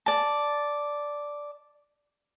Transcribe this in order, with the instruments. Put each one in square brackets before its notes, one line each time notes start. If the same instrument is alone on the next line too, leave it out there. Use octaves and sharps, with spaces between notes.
[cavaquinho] D5 A5